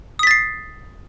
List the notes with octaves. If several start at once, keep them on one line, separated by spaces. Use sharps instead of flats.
D#6 A6 B6 C7